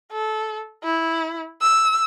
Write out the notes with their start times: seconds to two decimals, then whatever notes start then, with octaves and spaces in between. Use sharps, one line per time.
0.12 A4
0.83 E4
1.61 E6